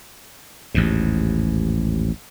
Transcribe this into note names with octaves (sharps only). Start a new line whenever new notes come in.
A1 D#2 G#2